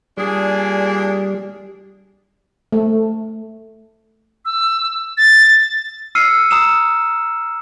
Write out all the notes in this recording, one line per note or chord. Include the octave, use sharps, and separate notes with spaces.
A#2 G3 D4 G#4
A3
E6
A6
E6 F6 C7 C#7 D#7
A#5 D#6 E6 E7